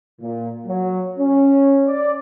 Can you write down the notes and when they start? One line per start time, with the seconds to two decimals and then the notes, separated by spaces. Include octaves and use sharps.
0.21 A#2
0.66 F#3
1.19 C#4
1.88 D5